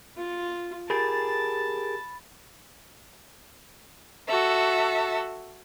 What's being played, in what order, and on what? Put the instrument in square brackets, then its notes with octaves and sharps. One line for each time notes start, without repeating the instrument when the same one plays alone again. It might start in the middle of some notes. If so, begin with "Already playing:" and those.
[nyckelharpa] F4
[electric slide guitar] G4 G#4 A#4 [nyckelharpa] A5 [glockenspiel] B5 A6
[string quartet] F#4 A4 E5